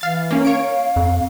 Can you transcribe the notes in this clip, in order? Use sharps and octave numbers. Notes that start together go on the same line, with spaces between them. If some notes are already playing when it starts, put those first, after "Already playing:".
E3 F5 A6
A#3 C#4
C#5 F5 D7
F2